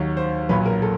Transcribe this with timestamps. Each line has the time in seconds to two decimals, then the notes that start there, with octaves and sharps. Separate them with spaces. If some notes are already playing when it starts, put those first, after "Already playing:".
Already playing: D#2 D#3 F#3
0.17 C5
0.49 B1 A#2 F#3 B4
0.66 A#4
0.82 A4